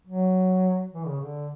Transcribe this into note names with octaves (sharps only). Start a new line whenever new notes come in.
F#3
E3
C#3
D3